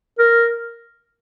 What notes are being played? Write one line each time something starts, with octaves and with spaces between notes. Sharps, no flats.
A#4